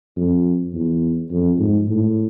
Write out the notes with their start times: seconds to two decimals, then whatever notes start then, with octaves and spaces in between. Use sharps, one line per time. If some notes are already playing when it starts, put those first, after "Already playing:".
0.17 F2
0.73 E2
1.31 F2
1.59 G#2
1.88 A2